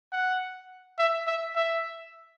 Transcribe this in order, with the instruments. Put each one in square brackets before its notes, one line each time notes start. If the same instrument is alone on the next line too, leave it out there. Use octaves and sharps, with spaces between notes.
[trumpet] F#5
E5
E5
E5